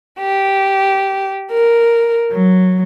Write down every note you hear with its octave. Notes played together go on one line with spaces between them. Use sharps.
G4
A#4
F#3